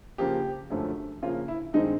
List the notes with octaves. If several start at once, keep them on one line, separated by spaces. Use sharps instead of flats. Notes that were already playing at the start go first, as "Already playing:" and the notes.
C#3 F3 A#3 G4
F#2 D3 F3 A3 C#4
C#3 F3 A#3 C#4 F4
E4
G2 D#3 G#3 C4 D#4